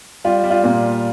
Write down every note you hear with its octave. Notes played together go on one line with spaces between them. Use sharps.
G3 F4
G3
F4
A#2